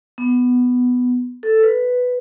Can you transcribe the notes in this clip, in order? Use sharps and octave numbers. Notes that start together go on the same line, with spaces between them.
B3
A4
B4